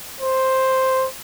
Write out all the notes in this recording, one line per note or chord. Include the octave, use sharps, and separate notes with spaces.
C5